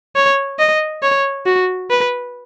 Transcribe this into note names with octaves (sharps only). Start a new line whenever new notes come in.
C#5
D#5
C#5
F#4
B4